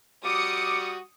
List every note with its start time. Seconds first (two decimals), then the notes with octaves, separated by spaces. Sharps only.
0.25 G3 F#4 D6 D#6 C#7